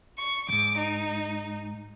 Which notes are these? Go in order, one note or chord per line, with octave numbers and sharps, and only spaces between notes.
C#6
F2 G#2 D6
D#4